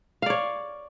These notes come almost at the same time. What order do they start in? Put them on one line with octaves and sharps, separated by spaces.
F5 D5 C#5